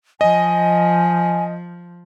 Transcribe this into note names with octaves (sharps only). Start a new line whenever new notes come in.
F3 D#5 G#5